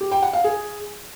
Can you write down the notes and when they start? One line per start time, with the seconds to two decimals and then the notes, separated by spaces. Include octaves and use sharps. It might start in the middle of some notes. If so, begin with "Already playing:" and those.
0.01 G4
0.12 G5
0.22 F#5
0.33 F5
0.44 G#4